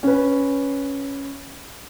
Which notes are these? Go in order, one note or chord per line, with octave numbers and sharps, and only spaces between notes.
C#4 B4